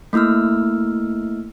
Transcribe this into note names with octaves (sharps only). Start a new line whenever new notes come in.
A3 A#3 E4 E6 F6